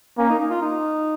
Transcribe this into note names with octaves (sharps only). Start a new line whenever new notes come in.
A#3 C#4
D#4
D#4
F4
D#4